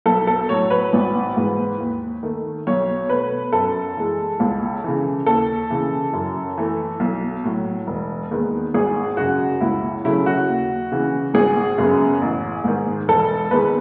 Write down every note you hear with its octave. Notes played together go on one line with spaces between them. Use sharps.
B1 A4
A4
A2 F#3 C#5
B4
G#1
G#2 E3
D#2
D#3 A3
B1 C#5
B2 A3 B4
F#2 A4
E3 G#3
C#2
C#3 E3
D#2 A4
C#3 E3
F#2
E3 A3
B1
A2 F#3
E1
D#2 D#3 G#3 B3
G#1 G#4
F#2 C#3 G#3 F#4
C#2 E4
C#3 F#3 A3 E4
F#4
D#2
C#3 E3
G#1 G#4
F#2 C#3 G#3 B3
A1
G#2 D#3
E1 A4
E2 D#3 G#3 B3 B4